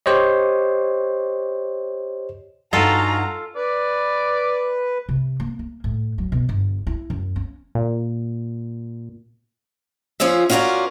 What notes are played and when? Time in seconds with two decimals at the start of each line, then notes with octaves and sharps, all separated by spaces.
0.06 G4 C5 C#5 D#5
2.73 G2 D#4 F4 F#4 A4 F5 G#5 A#5
3.56 B4 D5
5.09 C3
5.40 A#3
5.59 A#3
5.84 A2
6.18 F#3
6.32 B2
6.49 G1
6.87 E4
7.10 F#2
7.36 C#4
7.75 A#2
10.20 F3 C#4 F4 G#4 E5
10.50 C#4 F4 F#4 G#4 A#4 D5